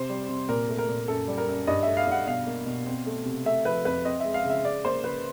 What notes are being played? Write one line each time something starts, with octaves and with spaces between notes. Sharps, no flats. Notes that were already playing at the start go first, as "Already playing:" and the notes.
Already playing: C3 C5
G3
C3
A#2 A#4
A3
A#4
A#2
F#2 A4
G3
A#4
F#2
G2 D#5
A3 E5
F5
G2 F#5
B2 F5
A#3
B2
C4
A3
C3
A3 E5
F3 B4
F2 B4
C4 D#5
G#3 E5
F5
C#3 E5
C#3 D5
A#3 C5
C#3 B4